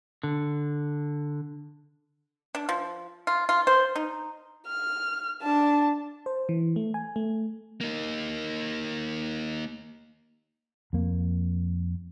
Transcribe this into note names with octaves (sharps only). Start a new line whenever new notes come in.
D3
D4
F3
F4
F4
C5
D#4
F6
D4 A5
C5
E3
A3
G#5
A3
A#3 D#4
F2 A#3